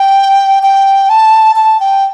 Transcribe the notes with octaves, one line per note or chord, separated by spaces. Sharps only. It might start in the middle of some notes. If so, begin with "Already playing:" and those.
Already playing: G5
G5
A5
A5
G5